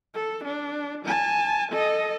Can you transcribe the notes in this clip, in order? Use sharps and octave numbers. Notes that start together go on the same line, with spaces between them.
A4
D4
G#5 A5
A4 D#5